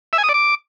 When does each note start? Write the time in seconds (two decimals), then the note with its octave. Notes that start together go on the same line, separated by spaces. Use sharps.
0.13 E5
0.18 G#5
0.23 D#6
0.29 D5
0.34 D6